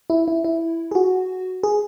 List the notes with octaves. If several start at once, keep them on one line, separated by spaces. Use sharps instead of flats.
E4
E4
E4
G#4
F#4
G#4